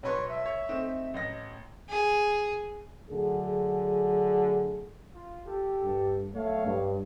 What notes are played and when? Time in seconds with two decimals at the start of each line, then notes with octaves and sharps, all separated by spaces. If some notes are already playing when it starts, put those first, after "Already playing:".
0.03 B1 B4 C#5 C6
0.29 E5
0.46 C#5
0.68 A3 C4 D#4
1.14 A1 D#5 A#6
1.89 G#4
3.10 D3 F#3 A3 G#4
5.13 F4
5.46 G4 A4
5.84 G2
6.35 B1 A3 C#5 F5
6.66 G2